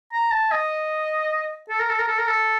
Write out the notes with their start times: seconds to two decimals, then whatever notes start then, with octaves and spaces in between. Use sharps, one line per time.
0.13 A#5
0.31 A5
0.52 D#5
1.69 A4
1.79 A#4
1.89 A4
1.99 A#4
2.08 A4
2.18 A#4
2.28 A4